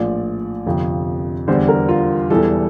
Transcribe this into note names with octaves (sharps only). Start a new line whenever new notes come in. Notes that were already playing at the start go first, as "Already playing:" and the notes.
Already playing: A#1 A2 F3 D5
G1 F2 C3 F3
E2 D3 G3 C5
A#4
F4
E1 E2 E3 G3 A4